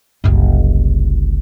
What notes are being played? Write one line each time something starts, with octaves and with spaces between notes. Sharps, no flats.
F#1 C2